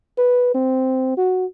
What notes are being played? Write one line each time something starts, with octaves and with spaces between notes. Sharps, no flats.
B4
C4
F#4